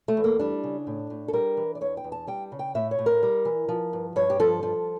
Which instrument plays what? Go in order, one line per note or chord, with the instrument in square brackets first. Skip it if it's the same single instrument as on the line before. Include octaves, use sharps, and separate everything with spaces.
[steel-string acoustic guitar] A3
E2
A#3
G3 D4
C#3
A2
A2
A4
G3 A#4
E3
D5
E2 C#5
G5
E2
A5
G3 G5
C#3
G5
A2 E5
C#5
A2
A#4
G3
E3
F3
G2
G2 C#5
G4
F3 A4
F3